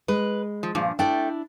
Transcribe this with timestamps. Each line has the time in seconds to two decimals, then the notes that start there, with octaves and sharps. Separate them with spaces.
0.08 G#3 B4
0.63 F3
0.75 G2 A#2 F3
0.99 A3 D4 E4 D5 G5